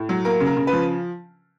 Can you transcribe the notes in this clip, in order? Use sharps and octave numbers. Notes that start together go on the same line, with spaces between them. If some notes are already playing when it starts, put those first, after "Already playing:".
Already playing: A2
F#3
A#3 A#4
C#3
A#4
C#3
B4
F3